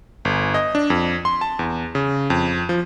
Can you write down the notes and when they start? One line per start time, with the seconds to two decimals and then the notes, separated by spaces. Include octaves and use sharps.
0.25 G1
0.54 D#5
0.75 D4
0.90 F2
1.25 C6
1.41 A5
1.59 E2
1.95 C#3
2.30 F2
2.69 F3